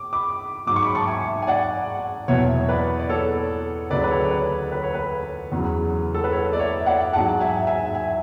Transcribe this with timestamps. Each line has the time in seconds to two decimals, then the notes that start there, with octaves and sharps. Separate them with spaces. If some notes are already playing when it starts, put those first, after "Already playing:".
Already playing: D6
0.13 B5 D6
0.67 G#2 F#3 D6
0.76 C#6
0.85 B5
0.95 A5 C#6
1.07 E5 G#5
1.42 G#5
1.47 D5 F#5
2.28 E2 B2 F#3 C#5 E5
2.69 B4 D5
2.99 D5
3.09 A4 C#5
3.90 D2 C#3 F#3 B4 D5
4.03 B4
4.10 A4 C#5
4.24 C#5
4.30 B4
4.72 B4
4.83 C#5
4.94 B4
5.52 E2 C#3 F#3
6.14 A4
6.24 B4
6.32 A4 C#5
6.53 D5
6.59 C#5 E5
6.86 D5 F#5
7.13 G#2 F#3 F#5 A5
7.40 E5 G#5
7.67 E5 G#5
7.94 E5 G#5